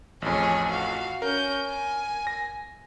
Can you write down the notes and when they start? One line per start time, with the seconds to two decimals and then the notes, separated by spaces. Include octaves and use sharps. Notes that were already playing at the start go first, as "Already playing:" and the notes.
0.22 A1 F2 G#4 C#5
0.69 F#4 F5
1.22 C#4 A#4 G6
1.66 G#5
2.27 A#6